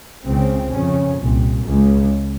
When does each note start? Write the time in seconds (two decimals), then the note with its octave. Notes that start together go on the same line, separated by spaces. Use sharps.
0.26 C#2 C#3 C4
0.72 F2 C#3 C#4
1.19 C2 A#2
1.65 C#2 C#3 G#3